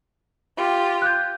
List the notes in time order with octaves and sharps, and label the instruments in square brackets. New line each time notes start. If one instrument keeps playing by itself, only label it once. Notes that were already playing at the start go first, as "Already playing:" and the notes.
[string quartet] F4 G4
[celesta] F#6 G6